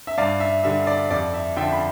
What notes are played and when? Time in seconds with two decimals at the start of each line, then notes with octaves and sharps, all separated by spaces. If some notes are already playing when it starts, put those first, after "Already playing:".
0.07 E5
0.18 G2 D5 F5
0.40 E5
0.64 D3 G3 E5
0.87 D5
1.11 F2 D5
1.34 E5
1.57 D3 F3 E5 G5
1.72 B5